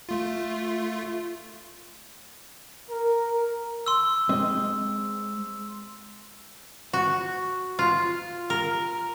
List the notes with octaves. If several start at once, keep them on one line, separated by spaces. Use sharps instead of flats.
A3 F4
A#4
C6 E6
G#3 C4 D#5
F#4
F4
A#4